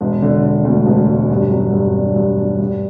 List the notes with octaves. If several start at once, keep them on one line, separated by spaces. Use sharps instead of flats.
E1
D3
D3
D2
E1
E1
G2
F#3
G2
D4
G2
D4
G2